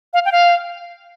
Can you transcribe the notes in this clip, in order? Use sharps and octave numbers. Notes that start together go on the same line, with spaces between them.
F5
G5
F5